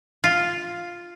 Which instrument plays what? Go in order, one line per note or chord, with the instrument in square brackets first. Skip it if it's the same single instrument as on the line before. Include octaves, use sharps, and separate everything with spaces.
[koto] F4